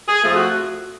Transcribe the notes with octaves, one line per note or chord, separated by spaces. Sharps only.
G#4
F2 F3 A3 F4
F#4